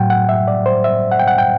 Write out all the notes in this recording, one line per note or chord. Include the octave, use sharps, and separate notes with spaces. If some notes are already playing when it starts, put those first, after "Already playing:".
Already playing: A2 F#3 F#5 G5
F#5
E5
D5
C5
E5
F#5
G5
F#5
G5